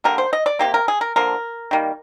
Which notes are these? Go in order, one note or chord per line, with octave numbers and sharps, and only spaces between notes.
D3 G3 A#3 A#4
C5
D#5
D5
C3 F3 A#3 G4
A#4
G#4
A#4
D3 F3 A#3 A#4
D#3 G3 A#3